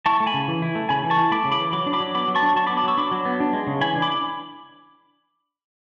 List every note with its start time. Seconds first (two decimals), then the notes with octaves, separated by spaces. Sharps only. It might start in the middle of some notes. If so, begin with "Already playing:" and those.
0.06 E4 A5 C#6
0.20 A3
0.26 G#5 B5
0.34 C#3
0.48 E3
0.62 E4
0.75 A3
0.89 C#3 G#5 B5
1.04 E3
1.10 A5 C#6
1.18 E4
1.32 A3 B5 D6
1.45 C#3
1.52 B5 D6
1.59 E3
1.72 F#3 B5 D6
1.86 D4
1.93 B5 D6
2.00 F#3
2.15 B3 B5 D6
2.28 F#3
2.35 A5 C#6
2.43 D4
2.56 F#3 A5 C#6
2.67 B3 B5 D6
2.77 B5 D6
2.84 F#3 C#6 E6
2.98 D4 B5 D6
3.11 F#3
3.25 B3
3.40 D4
3.53 G#3
3.67 C#3
3.81 E3 G#5 B5
3.96 D4
4.02 B5 D6